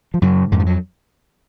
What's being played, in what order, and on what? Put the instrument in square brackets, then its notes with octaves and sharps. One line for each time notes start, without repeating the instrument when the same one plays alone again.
[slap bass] F3
F#2 C#3 F#3
F2 G#2 G#3
F3
F#3